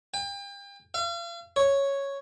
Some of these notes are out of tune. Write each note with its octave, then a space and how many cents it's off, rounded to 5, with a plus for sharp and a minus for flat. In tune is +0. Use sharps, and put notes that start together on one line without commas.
G5 +35
F5 -40
C#5 -5